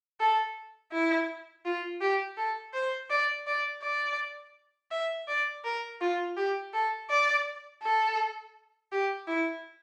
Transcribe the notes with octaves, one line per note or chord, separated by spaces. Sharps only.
A4
E4
F4
G4
A4
C5
D5
D5
D5
E5
D5
A#4
F4
G4
A4
D5
A4
G4
E4